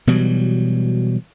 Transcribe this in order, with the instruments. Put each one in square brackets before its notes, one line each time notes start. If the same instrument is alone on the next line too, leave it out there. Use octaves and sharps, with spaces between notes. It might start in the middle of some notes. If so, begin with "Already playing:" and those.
[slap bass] B2 E3 F#3 G3